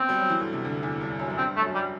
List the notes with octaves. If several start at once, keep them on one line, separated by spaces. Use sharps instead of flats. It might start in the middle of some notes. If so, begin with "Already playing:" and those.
Already playing: B2 C4
G3
F#3
E3
D2 D3
C3
D2 D3
E2 E3
G2 G3
F#2 F#3
F#3
G2 G3 C4
A3
F#2 F#3
G3